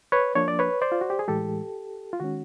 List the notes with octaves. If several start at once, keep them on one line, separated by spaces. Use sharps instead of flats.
B4 C#5
F3 A#3 D4 C#5
D5
B4 C#5
C5 D5
F4
F#4
G4
G#4
A2 E3 G#3 G4 A4
F4
D#3 G#3 C#4 F#4